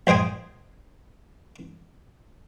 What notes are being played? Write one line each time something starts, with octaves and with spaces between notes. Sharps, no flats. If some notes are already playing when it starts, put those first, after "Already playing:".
A#1 C5 D#5 G5 G#5